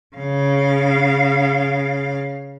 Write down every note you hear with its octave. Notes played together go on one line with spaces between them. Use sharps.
C#3 F5